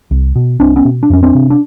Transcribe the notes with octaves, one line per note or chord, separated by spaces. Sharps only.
C2
B2
C2 C4 D4
B3 C#4
B2
D4
F2 C#4
C4 D4
C3
D4